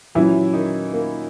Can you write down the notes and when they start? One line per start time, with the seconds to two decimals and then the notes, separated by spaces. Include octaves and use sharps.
0.15 A#2 E3 F#3 C#4 E4
0.54 D#3 D#4
0.93 A#3